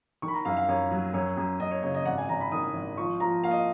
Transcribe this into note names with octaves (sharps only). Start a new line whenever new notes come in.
D#3 C#6
B5
A#5
F#2 F5
F5
F#2 C#5
F#3
F#2 C#5
F#2
F#2 D#5
C#5
C#3 C#5
D#5
G#1 F#5
G#5
G#1 A#5
B5
D#3 D#6
G#1
F3 C#6
F3 A#5
A#3 F5
D#5